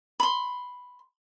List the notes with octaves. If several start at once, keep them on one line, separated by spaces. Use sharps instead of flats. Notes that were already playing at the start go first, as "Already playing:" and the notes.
B5 C6